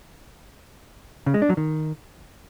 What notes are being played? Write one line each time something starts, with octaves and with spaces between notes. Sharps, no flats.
C#3
G#3
D4
F#3
D#3